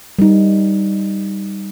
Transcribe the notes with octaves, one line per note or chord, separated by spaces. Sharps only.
G3 D#4